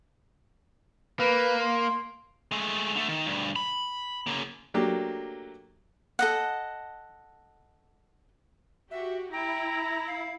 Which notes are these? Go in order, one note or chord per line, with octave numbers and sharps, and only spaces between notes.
A#3 B4
C6
G#3 A3
D3 A3
D#3
D2 G2
B5
C#3 A#3
F#3 A3 A#3 D4 G4
A4 D#5 F#5
F#4 G4 E5
E4 G5 A#5
F5